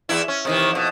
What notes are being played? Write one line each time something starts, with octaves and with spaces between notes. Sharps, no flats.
E2 E3 E4
C#4
C3 D#3 E3
F2 B2